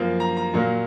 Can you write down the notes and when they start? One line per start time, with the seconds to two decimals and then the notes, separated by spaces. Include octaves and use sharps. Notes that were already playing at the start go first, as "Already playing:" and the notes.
Already playing: F#2 F3 A#3
0.20 A#5
0.37 A#5
0.53 A#2 F#3 A#3